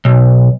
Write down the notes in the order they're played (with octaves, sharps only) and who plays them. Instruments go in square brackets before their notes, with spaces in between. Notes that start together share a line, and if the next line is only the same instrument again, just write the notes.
[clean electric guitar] B1